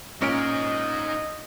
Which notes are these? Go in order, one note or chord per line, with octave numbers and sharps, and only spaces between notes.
A#2 C#4 D#4 D#5 G#5 F6 D7